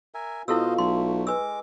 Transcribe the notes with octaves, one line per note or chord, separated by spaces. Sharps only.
A#4 E5 G#5
B2 E4 F4 A4 C5 D#5 F5 E6
B1 A3 C6
G#3 B4 D6 E6